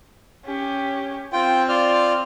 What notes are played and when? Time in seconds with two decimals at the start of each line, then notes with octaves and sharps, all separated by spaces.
0.45 C#4 G4
1.33 C4 F4 G5
1.69 F4 D5 F6